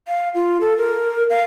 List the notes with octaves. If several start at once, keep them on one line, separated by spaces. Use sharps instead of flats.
F5
F4
A4
A#4
F5